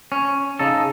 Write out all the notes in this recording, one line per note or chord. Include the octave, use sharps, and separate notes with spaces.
C#4
C#3 D#4 A4